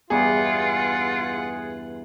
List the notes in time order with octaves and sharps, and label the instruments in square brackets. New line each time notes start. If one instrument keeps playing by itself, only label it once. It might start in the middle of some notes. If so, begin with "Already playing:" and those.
[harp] E2 G2 [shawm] F4 [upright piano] G#4 [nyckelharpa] F#5